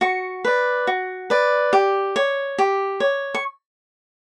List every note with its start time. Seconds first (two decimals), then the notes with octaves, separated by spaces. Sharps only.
0.01 F#4 C#6
0.45 B4 D5
0.87 F#4
1.30 B4 D5
1.73 G4
2.16 C#5
2.58 G4
3.00 C#5
3.34 C#6